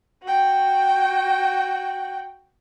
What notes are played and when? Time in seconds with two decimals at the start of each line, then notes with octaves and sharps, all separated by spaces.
0.23 F#4 G5